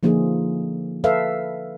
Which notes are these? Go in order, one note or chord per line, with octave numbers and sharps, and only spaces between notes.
D3 F3 A#3 D#4 F4 G#4
A4 B4 E5 F5